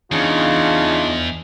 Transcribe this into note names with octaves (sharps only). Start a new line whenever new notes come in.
E2 C#3 D4 D#4 F4